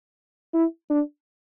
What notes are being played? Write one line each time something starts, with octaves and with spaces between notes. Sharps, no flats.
E4
D4